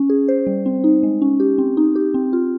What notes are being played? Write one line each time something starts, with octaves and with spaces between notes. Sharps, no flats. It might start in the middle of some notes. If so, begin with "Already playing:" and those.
Already playing: C#4
G#4
C5
G3
C4
D#4
G#3
C#4
G4
C4
D#4
G4
C4
F4